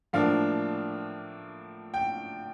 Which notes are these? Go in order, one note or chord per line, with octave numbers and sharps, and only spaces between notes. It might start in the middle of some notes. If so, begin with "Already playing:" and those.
A2 F3 A#3 D4 F5
G5